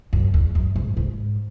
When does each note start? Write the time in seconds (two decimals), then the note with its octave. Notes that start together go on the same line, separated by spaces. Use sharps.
0.13 F#2
0.34 E2
0.55 F#2
0.76 G#2
0.97 G#2